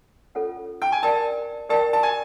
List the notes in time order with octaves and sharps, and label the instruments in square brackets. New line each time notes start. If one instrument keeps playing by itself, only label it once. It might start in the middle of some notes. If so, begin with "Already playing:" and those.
[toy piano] C#4 F4 A4 C#5 F#5
[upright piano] G5
G#5
[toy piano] D4 G4 A#4 D5 G5 [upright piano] A5
[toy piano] D4 G4 A#4 D5 G5 [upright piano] A5
[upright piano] A5
G#5